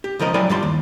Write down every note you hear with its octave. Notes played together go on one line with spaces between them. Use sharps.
G4
C#2 F3 A#4 D#5
F#3 E4 D5 F5 G5 G#5
G2 G3 F4 C6
D#2